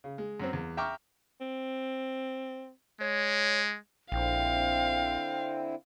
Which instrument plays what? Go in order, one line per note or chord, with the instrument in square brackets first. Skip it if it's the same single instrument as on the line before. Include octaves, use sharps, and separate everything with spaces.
[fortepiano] C#3
G#3
F#2 F#3 C4
E2
E5 G5 A#5 C#6 D6 F6
[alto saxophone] C4
[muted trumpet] G#3 [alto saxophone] C#5
[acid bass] A#1 [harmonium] D3 C4 E4 [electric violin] F5 [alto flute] G5